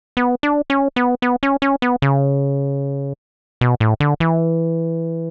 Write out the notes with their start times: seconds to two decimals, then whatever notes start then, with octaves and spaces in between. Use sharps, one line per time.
0.17 B3
0.43 D4
0.70 C#4
0.96 B3
1.22 B3
1.43 C#4
1.62 C#4
1.82 B3
2.02 C#3
3.61 B2
3.80 A2
4.00 D3
4.20 E3